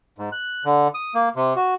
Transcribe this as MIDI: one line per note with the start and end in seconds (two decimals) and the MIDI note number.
0.19 0.29 44
0.32 0.64 90
0.65 0.88 50
0.95 1.14 87
1.15 1.29 58
1.36 1.54 48
1.56 1.74 66